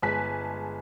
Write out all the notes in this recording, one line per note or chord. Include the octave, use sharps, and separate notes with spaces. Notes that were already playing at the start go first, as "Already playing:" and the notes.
G1 G#3 G#5 A5 F#6 B6